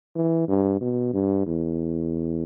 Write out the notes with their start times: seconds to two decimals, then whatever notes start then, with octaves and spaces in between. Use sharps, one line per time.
0.16 E3
0.48 G2
0.81 B2
1.14 G2
1.47 E2